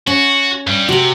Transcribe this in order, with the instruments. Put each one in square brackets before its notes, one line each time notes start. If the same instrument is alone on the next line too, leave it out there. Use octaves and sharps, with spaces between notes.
[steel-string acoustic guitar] C#4 [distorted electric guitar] F#4
[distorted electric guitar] G2 G3
[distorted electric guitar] C3 [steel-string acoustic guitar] F#4 G4